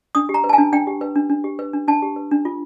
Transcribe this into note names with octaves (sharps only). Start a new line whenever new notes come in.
D4 D#6
G4
A#5
B4
A5
G#5
D4
D4 G5
G4
B4
D4
D4
G4
B4
D4
D4 A5
G4
B4
D4
F4